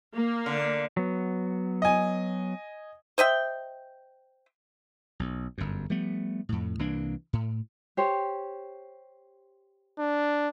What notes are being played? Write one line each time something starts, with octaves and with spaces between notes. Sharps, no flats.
A#3
D3
F#3 B3
D#5 G#5
C5 D#5 E5 G5
B1
G1 F#2
F3 G3 A3 B3
F2 A2
C2 E3 A#3 D4
A2
G4 C5 C#5
D4